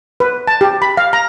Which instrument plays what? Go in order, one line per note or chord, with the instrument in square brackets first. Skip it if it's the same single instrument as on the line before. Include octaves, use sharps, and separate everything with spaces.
[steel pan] B4
A5
G4
B5
F5
A#5